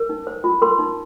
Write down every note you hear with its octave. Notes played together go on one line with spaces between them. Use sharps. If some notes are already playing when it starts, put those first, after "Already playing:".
Already playing: A#4
D#4
C5
F4
A#4 C6
D#4